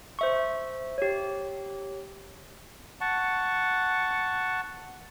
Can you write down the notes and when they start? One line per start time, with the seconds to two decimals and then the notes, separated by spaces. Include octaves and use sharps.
0.19 C5 E5 C#6
0.98 G4 C#5
3.01 F#5 A5 C#6